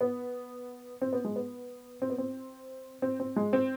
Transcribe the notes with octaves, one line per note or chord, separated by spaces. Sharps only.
B3
C4
B3
G#3
B3
C4
B3
C4
C4
C4
G#3
C4